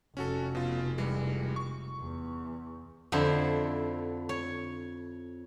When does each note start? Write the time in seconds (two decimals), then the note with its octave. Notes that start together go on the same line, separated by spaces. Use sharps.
0.17 F1 C#4 F#4 A4
0.55 B2 F4
0.98 E3 G3 G#3
1.56 C#6
2.01 E2
3.12 F2 D3 E4 C5
4.29 C#5